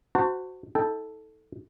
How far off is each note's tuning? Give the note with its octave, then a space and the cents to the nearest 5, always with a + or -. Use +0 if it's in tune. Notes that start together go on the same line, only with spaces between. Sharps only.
F#4 +0 C5 -15 A5 +35
D#4 +40 A4 +0 G5 +5